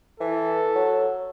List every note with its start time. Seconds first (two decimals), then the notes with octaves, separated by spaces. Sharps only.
0.20 E3 A4
0.75 F#3